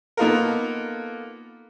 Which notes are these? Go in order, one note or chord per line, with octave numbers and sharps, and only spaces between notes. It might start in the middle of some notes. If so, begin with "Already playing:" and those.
A#3 B3 D#4 F4 A4 A#4